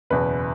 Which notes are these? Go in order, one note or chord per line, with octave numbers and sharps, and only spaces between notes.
F#1 E2 B2 B4